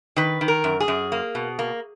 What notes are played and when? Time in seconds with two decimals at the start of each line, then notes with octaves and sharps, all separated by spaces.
0.16 D#3 B4
0.41 D#3
0.48 A#4
0.64 F#2
0.80 G#4
0.88 F#2
1.12 A#3
1.35 B2
1.59 A#3